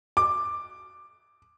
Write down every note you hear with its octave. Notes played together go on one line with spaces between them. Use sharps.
D6